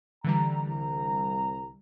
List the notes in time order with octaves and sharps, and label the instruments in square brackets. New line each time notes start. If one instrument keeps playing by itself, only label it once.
[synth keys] D3 E3 G3 [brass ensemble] A#5
[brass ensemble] C2 A#5